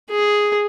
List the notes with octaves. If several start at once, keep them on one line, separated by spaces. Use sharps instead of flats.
G#4